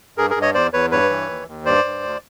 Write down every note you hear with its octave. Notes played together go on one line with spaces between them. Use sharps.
G2 G#4 A#4
G#4 A#4
G2
C#5 D#5
E2 C5 D5
E2 B4 C#5
G2 B4 C#5
E3
D#2
D#2
G2 C5 D5
G2
D2